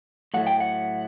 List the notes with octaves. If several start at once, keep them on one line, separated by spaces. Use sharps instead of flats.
A2 F#3 A3 F#5
G5
F#5